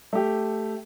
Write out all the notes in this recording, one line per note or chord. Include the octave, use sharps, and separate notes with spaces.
A3 G4